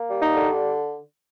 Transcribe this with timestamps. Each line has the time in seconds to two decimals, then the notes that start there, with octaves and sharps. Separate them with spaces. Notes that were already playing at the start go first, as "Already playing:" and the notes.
Already playing: A#3
0.09 G3
0.21 D#4
0.35 D3